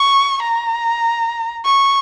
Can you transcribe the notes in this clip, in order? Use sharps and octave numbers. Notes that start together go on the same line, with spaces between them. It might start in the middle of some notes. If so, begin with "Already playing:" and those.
Already playing: C#6
A#5
C#6